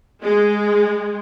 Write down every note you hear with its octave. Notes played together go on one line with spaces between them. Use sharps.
G#3